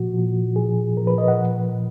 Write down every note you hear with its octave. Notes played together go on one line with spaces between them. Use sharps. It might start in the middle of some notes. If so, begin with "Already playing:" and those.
Already playing: A#2 F3 F#4
A#2 F3
A#2 F3 G#4
A#2 F3 A#4
B4
D#5
F#5
A#2 F3